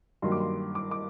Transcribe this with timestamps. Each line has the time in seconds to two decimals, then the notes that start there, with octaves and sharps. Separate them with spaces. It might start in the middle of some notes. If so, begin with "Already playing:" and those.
0.22 G2 D#3 F#3 A#3 C6
0.32 D6
0.40 C6
0.75 D6
0.91 D6